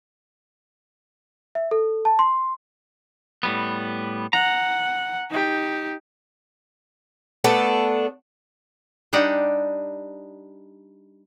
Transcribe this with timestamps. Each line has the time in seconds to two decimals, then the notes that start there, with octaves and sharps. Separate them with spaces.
1.55 E5
1.71 A4
2.05 A5
2.19 C6
3.43 A2 G3 B3
4.33 F#5 A#5
5.30 D#4 G4
7.44 A3 B3 D4 A4
9.13 G3 D4 D#4 G4 F#5